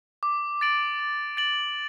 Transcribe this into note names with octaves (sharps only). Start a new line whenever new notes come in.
D6
A6 D7 F#7
D6
A6 D7 F#7